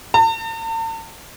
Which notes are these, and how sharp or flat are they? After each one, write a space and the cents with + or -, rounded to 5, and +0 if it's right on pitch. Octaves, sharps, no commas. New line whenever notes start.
A5 +45